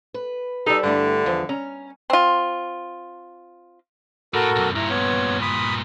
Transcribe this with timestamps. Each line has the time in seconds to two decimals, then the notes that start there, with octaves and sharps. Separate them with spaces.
0.14 B4
0.66 G3 D#4 A4
0.83 G2 D3 A3 E4
1.26 E2 F3
1.49 C#4 A#5
2.10 C4 F4
4.34 A2 F#4 A4 A#4
4.56 B1 F#2
4.76 G2 A#2 E4 A#5
4.90 B3 C#5
5.42 B5 D#6